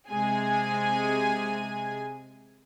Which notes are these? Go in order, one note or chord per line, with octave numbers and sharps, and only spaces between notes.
C3 G#3 G#4 G#5